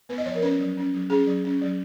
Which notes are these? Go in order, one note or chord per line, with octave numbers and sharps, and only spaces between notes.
B3 B4
D#5
F3 C#5
A#4
C#4 B4
F#3
C#4
F#3
C#4 G#4
F#3
C#4
F#3